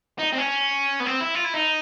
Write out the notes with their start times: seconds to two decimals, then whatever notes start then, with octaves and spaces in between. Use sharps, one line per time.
0.19 D#4
0.32 C4
0.38 C#4
1.00 B3
1.06 C4
1.20 E4
1.35 F4
1.44 E4
1.54 D#4